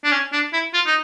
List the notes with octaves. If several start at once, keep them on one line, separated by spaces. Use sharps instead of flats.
D4
C#4
D4
E4
F4
D#4